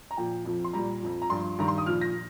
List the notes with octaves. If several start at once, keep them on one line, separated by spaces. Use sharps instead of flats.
A#5
A#2 F3 G5
F2 F3
C6
A#2 G3 A#5
F2 F3
A#5
G2 F3 C6
G2 D#3 G3 A#5
C6
D#6
A#2 F3 F6
A#6